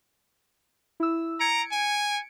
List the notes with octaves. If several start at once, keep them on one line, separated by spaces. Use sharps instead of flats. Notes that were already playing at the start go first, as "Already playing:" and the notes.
E4 E6
A#5 G#6 C#7 D7
G#5